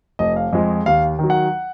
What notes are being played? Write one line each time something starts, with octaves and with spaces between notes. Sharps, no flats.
F1 D#5
F5
F2 F3 G#3 D#5
D#2 F5
D#3 F#3
F#5